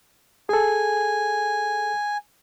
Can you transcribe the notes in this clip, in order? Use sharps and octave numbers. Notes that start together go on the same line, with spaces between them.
G#4 A4 G#5